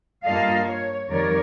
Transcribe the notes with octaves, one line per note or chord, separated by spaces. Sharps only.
G2 A#3 F4 A4 D#5 F5
C#5
F2 D#3 G3 A#4 C#5 D5